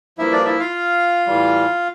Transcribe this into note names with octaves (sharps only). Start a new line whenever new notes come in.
G2 F3 A#3 E4 E5
D4 D5
E4 E5
F4 F5
A2 E3 G3